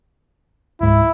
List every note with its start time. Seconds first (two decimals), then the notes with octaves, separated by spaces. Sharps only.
0.81 C#2 G#2 E4